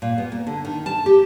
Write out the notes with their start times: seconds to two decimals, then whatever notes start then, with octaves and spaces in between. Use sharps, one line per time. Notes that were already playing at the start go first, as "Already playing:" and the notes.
0.02 A#2
0.18 B3
0.32 A#3
0.47 D3
0.65 D#3
0.86 A5
1.06 G4